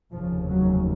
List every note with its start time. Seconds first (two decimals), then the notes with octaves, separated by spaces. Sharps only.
0.12 F1 D#2 C#3 F3
0.51 F#3